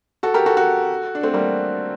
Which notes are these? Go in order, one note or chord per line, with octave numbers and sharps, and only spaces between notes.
F#4 A4
G4 A#4
F#4 A4
F#4 A4
D4
A3 C4
G3 A#3